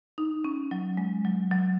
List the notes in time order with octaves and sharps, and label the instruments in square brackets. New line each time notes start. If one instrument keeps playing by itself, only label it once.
[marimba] D#4
C#4
F#3
G#3
F#3
F#3